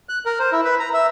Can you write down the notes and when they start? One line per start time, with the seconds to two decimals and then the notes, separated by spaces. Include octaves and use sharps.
0.09 F#6
0.25 A#4
0.39 C5
0.52 E4
0.65 B4
0.80 A#5
0.93 E5